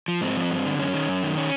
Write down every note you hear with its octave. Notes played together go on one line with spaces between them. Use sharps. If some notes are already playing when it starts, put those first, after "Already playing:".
F3
G#2 C4
F3
G2
D3
F#2 C#4
D#3
F#2
D#3
C#4